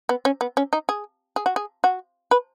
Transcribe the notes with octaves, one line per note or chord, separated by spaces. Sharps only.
B3
C#4
B3
C#4
D#4
G#4
G#4
F#4
G#4
F#4
B4